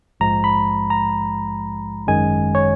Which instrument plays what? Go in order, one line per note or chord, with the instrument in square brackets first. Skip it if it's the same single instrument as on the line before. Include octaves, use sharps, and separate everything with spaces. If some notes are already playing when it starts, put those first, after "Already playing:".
[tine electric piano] A#1 G#2 F3 G#3 A#5
B5
A#5
G#1 F#2 D#3 G#3 G#5
C#5